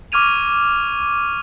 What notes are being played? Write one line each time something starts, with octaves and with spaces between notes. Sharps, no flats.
C#6 D6 F6 G#6 D#7 F7